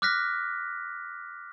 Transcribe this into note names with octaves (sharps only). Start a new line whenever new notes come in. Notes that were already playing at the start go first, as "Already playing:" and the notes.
D6 F6 F#6 A#6 B6